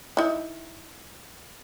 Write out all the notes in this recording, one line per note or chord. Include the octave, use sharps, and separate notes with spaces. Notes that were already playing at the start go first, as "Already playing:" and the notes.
D#4 E4